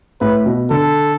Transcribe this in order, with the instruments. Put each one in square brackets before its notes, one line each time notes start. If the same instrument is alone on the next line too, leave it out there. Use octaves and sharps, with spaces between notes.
[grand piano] A2 [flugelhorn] B4
[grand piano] B2
[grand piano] D3 [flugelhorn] A4